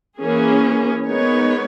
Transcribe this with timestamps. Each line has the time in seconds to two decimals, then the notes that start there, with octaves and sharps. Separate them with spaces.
0.19 E3 A#3 C#4 G#4
1.06 G#3 B3 D#4 A#4 C#5